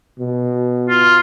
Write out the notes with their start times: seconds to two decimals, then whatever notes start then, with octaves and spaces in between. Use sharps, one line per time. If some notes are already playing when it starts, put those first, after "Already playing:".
0.19 B2
0.89 F4